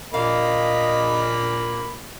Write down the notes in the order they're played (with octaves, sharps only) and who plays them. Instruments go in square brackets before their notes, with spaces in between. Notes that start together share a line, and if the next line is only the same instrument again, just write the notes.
[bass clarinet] A#2 [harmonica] A#3 B5 [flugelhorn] D#5 [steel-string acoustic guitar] F5